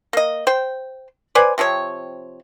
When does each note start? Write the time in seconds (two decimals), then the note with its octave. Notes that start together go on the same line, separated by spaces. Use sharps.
0.13 A#3 D#5
0.47 C5 G5
1.35 B4 C5 D5 G#5
1.58 C3 F3 C4 C#5